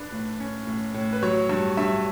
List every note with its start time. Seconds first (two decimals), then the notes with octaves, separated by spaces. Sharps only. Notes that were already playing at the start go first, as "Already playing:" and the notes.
Already playing: D4 B4
0.12 A2
0.40 C#4
0.67 A2
0.94 A2
1.13 B4
1.23 F#3 C#5
1.49 G2
1.77 G2 E5